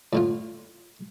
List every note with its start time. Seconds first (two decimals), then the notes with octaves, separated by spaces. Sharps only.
0.13 A2 D3 F4